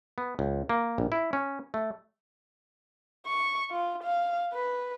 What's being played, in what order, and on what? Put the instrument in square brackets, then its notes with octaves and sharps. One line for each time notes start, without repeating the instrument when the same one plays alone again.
[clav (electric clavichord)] B3
C#2
A#3
A#1
E4
C#4
A3
[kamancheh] C#6
F4
F5
B4